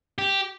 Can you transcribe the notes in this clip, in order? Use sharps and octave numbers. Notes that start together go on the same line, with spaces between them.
G4